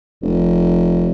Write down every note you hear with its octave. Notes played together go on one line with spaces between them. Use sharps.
F1